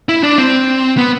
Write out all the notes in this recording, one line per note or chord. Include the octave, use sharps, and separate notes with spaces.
E4
D4
C4
B3